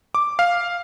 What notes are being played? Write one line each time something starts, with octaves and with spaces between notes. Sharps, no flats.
D6
F5